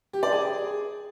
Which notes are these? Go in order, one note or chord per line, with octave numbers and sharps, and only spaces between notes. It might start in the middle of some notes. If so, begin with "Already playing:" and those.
G4
D5
G#4